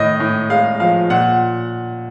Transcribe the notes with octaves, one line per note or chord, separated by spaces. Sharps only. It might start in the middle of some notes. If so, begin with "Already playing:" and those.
Already playing: A2 D#3 D#5
A2
G#3 F5
F3 F5
A#2 F#5